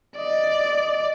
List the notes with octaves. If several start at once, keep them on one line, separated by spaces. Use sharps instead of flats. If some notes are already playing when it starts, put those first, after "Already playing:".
D5 D#5
D#5